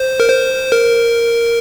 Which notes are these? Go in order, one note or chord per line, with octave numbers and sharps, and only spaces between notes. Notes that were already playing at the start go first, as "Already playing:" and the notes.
Already playing: C5
A#4
C5
A#4